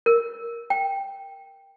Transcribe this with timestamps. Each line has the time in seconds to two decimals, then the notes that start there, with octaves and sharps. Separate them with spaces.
0.06 A#4
0.70 G5